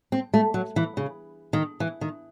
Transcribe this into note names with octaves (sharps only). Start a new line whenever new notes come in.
C4
A3
F#3
E3
C#3
D#3
E3
D#3